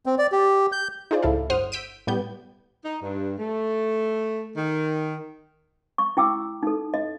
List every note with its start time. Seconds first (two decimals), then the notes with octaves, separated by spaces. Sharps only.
0.06 C4
0.18 D5
0.32 G4
0.72 G6
1.11 D#4 F4 G#4 C5 D5
1.22 C#2 A2 E4 A4 F5
1.50 G1 C5 F#5 C6 D#6 F6
1.72 E6 G6 B6 D7 D#7
2.07 A2 G3 B3 G4 G6
2.84 D#4
3.01 G2
3.38 A3
4.56 D#3
5.98 C#6
6.17 E4 G5 D6 E6
6.63 D#4 A4
6.94 D#5